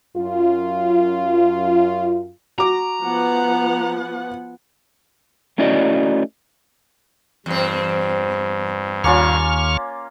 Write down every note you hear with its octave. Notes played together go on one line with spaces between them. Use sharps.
F#2 F4
F#4 A#5 D6
F3 B3 F#5
A3 C#4 E4 F#4 D5 D#5
E2 G2 C4
D#2 A#3 C#4 F4 C#6 F6